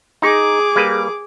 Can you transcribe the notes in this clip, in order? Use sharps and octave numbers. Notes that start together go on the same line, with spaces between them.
D#4 G#4 D6
G3 A#3 B4